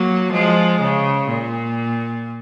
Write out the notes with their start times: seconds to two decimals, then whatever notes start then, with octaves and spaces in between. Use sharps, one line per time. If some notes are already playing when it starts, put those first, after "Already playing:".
Already playing: F#3 A#3
0.32 F3 G#3
0.81 C#3
1.29 A#2